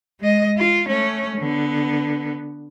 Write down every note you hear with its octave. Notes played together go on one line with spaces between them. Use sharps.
G#3 D#5
F4
A3 C#4
D3 B3